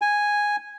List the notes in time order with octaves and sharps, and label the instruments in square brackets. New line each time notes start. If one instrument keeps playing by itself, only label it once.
[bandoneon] G#5